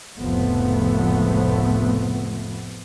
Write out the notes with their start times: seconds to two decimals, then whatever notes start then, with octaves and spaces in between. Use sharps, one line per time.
0.19 F1 C#2 A2 F3 A3 B3